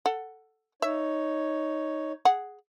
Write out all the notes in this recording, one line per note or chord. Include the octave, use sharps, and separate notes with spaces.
A4 F#5
D#4 C#5 E5
G#4 F#5